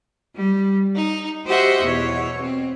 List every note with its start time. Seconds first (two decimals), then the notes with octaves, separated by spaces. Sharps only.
0.36 G3
0.95 D#4
1.45 F#4 G4 C5 D#5 E5 F#5
1.83 E2 B2 C#5
2.41 C4